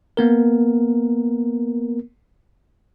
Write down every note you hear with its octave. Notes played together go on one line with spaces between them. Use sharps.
A#3 B3 A#4